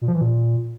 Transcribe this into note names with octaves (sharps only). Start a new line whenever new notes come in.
A#2
F3
E3
A#2